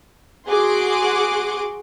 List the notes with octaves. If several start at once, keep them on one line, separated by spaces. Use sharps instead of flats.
F#4 G#4 F#5 C6 D6